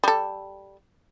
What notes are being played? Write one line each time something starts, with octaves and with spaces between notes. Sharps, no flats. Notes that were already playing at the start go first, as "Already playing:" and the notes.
G3 A4